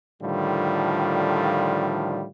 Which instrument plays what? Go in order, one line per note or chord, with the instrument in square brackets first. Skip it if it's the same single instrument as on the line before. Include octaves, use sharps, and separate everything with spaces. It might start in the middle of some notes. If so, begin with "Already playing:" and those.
[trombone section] A2 D3 D#3 F3 G3 F4